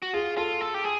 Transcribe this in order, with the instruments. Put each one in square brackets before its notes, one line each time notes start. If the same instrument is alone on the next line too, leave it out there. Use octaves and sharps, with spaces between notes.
[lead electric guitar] F#4
[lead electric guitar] F4 [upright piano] G#4
[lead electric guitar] F4 [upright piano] A4
[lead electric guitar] A4
G4
G#4